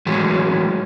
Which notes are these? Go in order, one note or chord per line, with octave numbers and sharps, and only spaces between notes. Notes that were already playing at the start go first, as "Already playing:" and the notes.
A2 E3 F#3 G#3